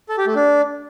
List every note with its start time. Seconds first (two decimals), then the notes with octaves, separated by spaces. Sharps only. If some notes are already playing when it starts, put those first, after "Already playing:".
0.09 A4
0.18 G4
0.27 A3
0.36 D4